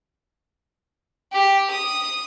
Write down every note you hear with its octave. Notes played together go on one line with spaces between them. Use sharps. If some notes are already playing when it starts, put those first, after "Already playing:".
G4
D#6